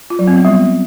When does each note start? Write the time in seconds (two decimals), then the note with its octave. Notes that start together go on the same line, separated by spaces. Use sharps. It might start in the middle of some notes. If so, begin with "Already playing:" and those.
0.10 F4
0.19 F#3
0.28 C4
0.36 B3
0.45 G3